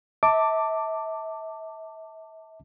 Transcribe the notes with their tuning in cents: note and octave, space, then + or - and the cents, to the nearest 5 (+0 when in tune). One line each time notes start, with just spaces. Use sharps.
E5 -40 A5 +20 D6 +0